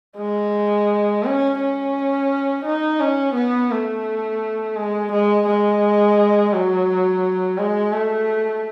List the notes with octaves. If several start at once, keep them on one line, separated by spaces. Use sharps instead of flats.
G#3
C#4
C#4
D#4
C#4
B3
A3
G#3
G#3
G#3
F#3
G#3
A3